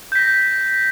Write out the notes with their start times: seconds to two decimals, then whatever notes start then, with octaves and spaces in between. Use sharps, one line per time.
0.12 G6
0.15 B6
0.19 A#6